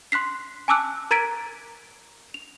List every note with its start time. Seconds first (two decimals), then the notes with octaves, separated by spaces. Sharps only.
0.12 C6 F#6 B6 C7
0.68 G#5 A5 D6 E6 F#6
1.11 A#4 A#5 G#6 A6 B6 D7
2.34 F7